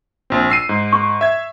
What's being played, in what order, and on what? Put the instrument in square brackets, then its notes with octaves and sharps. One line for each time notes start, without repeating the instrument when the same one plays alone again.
[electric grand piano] A#1 C4
E6 C7 D#7
G#2
[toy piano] C#6
[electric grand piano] E5 G#6